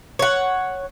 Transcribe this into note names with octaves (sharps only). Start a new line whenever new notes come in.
C#5 F#5